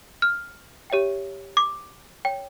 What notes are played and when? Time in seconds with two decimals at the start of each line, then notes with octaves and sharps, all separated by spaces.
0.22 F6
0.90 G4 C#5 E5 G5
1.57 D6
2.25 C#5 G5